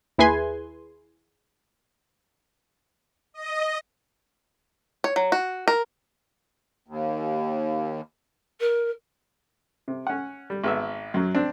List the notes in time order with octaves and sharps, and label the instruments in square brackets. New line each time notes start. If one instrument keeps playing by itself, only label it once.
[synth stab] D#2 E4 G#4 B4 G#5 C6
[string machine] D#5
[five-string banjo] C#5
F#3
F#4
A#4
[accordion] D#2
[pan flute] A#4
[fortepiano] C3
C#4 F#5
G3
G#1 B3 E5
F#2 F#3
C4 D4